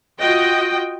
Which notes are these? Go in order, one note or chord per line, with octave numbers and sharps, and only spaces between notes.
F4 F#4 D#5 G5